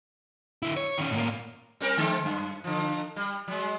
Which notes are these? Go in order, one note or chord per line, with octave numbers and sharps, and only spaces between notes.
D3 E4
C#5
D#3 C#4
A2 A#3
G3 C4 A#4
D3 G#3 C4
F#2
D3 F3
G3
F#3 G#3